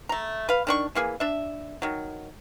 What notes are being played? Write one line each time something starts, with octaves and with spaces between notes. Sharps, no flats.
A3 A#5
B4 F5
D#3 D4 C#6
E3 A#3 G#4
D4 E5
D#3 F#3